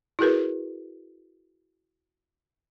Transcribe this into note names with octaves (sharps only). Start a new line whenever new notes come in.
E4 F#4 G#4 A#4 B4